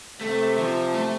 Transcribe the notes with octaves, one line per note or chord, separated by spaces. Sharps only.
C3 A3
F3
A3